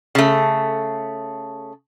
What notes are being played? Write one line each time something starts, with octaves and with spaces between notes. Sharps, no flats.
C#3 A3